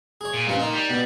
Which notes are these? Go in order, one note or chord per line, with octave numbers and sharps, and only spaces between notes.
G#4 C#5
A#2
G2 F3 C#4
D#3 D#4
G3
B2